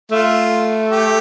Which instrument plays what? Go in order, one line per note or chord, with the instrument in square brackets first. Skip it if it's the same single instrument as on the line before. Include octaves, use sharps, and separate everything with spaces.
[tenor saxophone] A3 [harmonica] F4
[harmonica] G4